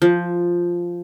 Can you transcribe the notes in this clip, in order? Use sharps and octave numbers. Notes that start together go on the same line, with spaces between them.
F3